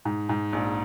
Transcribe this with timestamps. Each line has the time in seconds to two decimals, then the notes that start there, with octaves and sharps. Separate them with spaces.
0.05 G#2
0.29 G#2
0.53 A#1